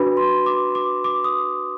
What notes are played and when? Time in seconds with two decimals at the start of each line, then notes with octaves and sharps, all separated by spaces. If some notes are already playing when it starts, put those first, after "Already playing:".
Already playing: D4 F#4 B4 B5
0.17 C6
0.46 D6
0.75 D6
1.04 D6
1.24 D#6